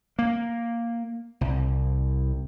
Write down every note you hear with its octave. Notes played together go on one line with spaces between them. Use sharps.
A#3
C2